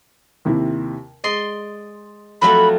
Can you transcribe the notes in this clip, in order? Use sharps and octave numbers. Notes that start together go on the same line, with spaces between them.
D#2 C3 E4
G#3 D5 D#5 C6
F2 F#3 A3 B5